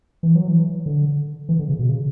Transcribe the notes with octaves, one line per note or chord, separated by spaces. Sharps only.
E3
F#3
E3
D3
E3
D3
C#3
B2
C#3